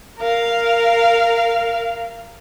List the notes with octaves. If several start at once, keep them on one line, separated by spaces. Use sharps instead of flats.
A#4 F5